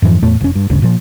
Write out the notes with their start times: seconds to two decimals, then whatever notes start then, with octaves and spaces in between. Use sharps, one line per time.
0.02 F2 G#2 E3 F3
0.22 E2 A2 A3
0.41 F1 C#4
0.55 G2
0.70 G1 D2 C#3
0.82 A#2 F3